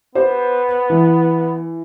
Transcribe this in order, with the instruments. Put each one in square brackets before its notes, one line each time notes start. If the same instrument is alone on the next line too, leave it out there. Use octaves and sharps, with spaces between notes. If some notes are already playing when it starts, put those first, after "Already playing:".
[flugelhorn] B3 [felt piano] G4 C5
[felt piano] E3